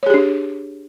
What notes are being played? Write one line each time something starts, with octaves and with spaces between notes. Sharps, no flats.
D4 G4 G#4 C#5